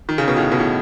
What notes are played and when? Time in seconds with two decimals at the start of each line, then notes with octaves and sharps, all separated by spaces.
0.09 D#3
0.18 C#3
0.28 B2
0.37 A2 C#3
0.52 B2
0.60 A2